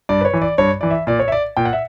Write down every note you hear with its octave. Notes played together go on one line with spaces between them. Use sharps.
G2 D5
B4
C#5
E3
D5
G2 C#5
E3 D5
E5
A#2 D5
C#5
E5
D5
A#2 G5
F#5
E5